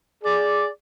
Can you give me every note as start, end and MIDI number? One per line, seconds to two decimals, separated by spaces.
0.24 0.68 68
0.24 0.68 74